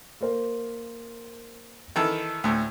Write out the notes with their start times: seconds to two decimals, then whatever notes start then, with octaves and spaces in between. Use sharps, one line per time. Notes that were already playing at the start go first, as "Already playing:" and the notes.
0.21 A#3 A#4 C5
1.96 D#3 E3 A4
2.44 D2 A2